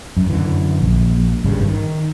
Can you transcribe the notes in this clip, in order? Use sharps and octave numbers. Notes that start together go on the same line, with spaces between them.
F#2
F#2 D3 E3
A#1
G#1 G2 C#3
D#3